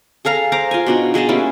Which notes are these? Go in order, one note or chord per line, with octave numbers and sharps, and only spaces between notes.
G#4 A4 F5 A#5
C5 F5 A#5 D6
F4 G#5
B2 D4 D#4
B2 G#4 D#5 A5
G3 A#3 C#4 E4